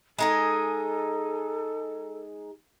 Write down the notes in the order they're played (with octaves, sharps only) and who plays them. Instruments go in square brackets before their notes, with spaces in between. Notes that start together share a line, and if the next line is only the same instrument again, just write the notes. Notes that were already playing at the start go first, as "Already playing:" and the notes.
[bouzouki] G#3 D#4 G#4 [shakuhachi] A4